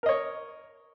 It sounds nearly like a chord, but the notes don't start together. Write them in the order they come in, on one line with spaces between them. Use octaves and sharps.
A#4 D#5 C#5